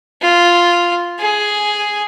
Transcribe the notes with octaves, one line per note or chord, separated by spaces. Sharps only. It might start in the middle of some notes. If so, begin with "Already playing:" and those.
F4
G#4